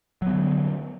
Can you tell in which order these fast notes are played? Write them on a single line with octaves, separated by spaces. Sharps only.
F#3 B3 D3